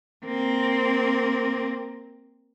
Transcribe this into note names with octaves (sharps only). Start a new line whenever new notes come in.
A#3 C4